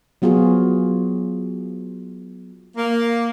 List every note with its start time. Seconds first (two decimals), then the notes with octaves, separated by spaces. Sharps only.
0.22 F#3 B3 F4 F#4 G#4
2.77 A#3